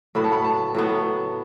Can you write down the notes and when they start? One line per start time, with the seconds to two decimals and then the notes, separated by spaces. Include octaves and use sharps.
0.15 A2 F#3 B3 B5
0.24 A5
0.32 B5
0.44 A5
0.75 A2 F#3 B3